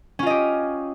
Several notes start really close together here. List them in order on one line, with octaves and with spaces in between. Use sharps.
C#4 F4 D#5 G4